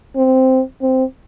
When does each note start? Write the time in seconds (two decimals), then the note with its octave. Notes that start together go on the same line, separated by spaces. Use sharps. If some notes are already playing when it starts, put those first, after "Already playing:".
0.16 C4
0.81 C4